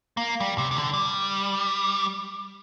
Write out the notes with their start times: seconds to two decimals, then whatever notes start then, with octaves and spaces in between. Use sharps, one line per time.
0.17 A#3
0.40 G3
0.58 C3
0.71 C3
0.76 D3
0.94 G3